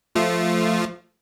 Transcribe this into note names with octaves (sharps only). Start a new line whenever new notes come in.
F3 A3 F4